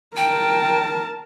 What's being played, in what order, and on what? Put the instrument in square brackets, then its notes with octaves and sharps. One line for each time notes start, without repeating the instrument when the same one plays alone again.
[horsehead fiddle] A#4 A5 [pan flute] G5